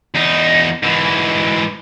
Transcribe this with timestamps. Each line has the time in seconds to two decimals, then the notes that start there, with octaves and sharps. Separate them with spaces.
0.14 E2 D#4
0.84 G#2 E3